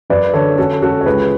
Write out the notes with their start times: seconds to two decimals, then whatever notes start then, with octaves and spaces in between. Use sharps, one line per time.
0.10 F#2 B4 D5
0.33 D3 A4 C#5
0.58 C#4 F#4 A4
0.82 C#4 F#4 A4
1.01 C#5
1.06 C#2 G#4 B4